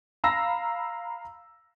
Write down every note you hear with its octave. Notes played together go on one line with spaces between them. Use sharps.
F5 A#5 B5 E6 A#6